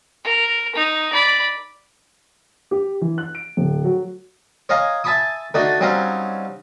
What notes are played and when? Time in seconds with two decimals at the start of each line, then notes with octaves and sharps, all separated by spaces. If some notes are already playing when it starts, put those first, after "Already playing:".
0.24 A#4
0.75 D#4
1.13 D5 B5
2.71 G4
3.01 E3
3.18 F#6
3.35 D7
3.57 D1
3.84 F#3
4.69 C#5 D#5 F5 G#5 A#5
5.04 E5 G#5 A5 B5 C#6 D#6
5.54 D3 A3 D4 D#4 F#4
5.81 F#3 G3 C4 C#4 D#4 F5